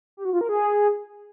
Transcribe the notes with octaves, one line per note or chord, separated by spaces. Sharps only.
G4
F#4
F4
A#4
G#4